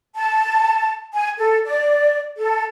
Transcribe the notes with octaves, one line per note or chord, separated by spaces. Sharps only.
A5
G#5
A4
D5
A4